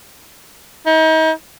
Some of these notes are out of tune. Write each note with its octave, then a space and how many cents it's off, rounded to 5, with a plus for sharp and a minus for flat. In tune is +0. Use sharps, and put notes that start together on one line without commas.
D#4 +40